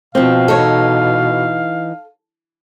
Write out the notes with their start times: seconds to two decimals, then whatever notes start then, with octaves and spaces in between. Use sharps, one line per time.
0.15 B2 F3 C4 F5
0.48 E3 D#4 A4 C#5